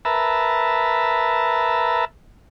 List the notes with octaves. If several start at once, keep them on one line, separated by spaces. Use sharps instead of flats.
A#4 B4 E5 A5